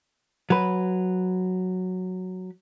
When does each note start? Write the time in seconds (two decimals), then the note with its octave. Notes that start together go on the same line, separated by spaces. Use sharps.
0.50 F#3 B4